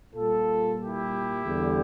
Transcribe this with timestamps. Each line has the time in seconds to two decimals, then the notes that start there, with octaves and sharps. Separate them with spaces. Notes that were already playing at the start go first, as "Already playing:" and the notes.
0.15 A#2 G3 F4 A4
0.80 E4 G4
1.46 E2 D3 G3